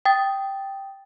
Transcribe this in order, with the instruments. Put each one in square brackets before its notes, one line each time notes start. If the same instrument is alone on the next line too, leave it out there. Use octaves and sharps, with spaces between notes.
[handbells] G5 D#6 A6